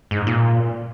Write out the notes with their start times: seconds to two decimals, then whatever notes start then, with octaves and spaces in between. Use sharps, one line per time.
0.11 G#2
0.27 A#2